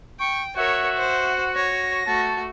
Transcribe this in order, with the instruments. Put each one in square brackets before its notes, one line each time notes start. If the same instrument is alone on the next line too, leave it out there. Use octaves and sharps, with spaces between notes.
[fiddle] G5 [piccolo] C#6
[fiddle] F#4 [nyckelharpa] A#4 C#5 [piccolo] E5 [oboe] F#5
[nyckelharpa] C5
[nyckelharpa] C#5 [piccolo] A#6
[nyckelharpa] A3 [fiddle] F#4 [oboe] A5